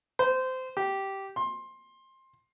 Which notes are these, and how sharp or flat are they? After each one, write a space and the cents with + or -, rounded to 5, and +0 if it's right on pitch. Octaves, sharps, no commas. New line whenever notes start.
C5 -20
G4 -10
C6 +20